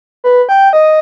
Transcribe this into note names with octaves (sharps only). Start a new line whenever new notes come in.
B4
G5
D#5